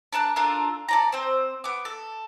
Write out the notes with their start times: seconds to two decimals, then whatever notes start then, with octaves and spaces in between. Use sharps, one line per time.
0.12 D4 A#4 A5 F#6
0.36 D4 F4 A4 A#4
0.88 A4 D5 A#5
1.12 C4 C5
1.64 B3 D6
1.85 A4